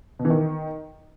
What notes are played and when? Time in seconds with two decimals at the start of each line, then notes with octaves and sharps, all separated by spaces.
0.19 B2
0.25 E3
0.30 D#3